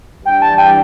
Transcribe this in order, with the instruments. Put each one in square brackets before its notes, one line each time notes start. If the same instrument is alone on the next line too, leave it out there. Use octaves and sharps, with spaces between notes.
[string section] E3 G3 D4 [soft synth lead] G5
[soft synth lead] A5
G5